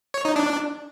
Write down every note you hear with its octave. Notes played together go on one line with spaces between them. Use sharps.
C#5
D#4
D4